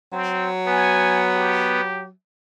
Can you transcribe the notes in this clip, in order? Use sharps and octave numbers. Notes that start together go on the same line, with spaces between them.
F#3 C4
B3 G#5
G4